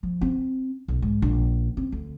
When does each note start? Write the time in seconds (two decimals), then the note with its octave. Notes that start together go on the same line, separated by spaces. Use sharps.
0.03 F3
0.21 C4
0.88 B1
1.02 G#2
1.22 A#1
1.77 C4
1.92 D2